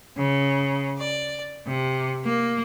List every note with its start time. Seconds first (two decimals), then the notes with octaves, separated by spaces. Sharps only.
0.17 C#3
0.98 D5
1.66 C3
2.24 A#3